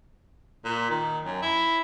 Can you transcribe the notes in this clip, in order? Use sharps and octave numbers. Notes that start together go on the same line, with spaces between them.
A#2
D#3
F#2
E4